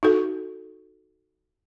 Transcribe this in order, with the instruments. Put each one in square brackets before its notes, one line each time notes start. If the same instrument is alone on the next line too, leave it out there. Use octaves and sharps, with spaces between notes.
[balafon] D#4 F#4 A4